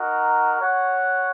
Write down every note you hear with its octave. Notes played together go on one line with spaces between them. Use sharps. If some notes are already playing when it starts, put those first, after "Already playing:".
Already playing: D#4 F#4 A#4
F#4 C#5 F#5